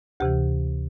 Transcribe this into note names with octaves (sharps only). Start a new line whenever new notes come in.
D2 C3 E3 G4